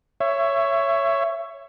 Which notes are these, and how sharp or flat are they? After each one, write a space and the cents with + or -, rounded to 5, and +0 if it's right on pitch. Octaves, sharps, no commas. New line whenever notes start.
C#5 +0 E5 +20